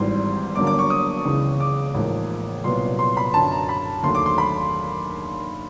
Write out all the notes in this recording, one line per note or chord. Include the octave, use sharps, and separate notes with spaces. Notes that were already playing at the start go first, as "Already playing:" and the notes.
Already playing: G#1 G#2 E3 G3 C6
G1 G2 D3 F#3 A#3 D6
D6
C#6
D#6
C#2 C#3 E3
D6
A1 G#2 F3 A#3
C2 A#2 F#3 B3 C6
C6
B5
F#2 D3 F#3 A5
A#5
B5
D#2 D3 F#3 A3 C6
D6
C6
B5